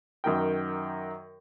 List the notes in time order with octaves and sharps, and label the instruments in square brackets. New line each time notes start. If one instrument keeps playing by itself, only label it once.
[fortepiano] F#2 D#3 A#4 G5